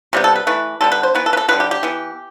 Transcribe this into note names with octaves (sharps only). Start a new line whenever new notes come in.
C3 G3 B3 G4
A4
B4
E3 A3 B4
D3 G3 B3 A4
B4
C5
E3 B3 B4
A4
B4
A4
D3 G3 B3 B4
G4
G4
E3 B3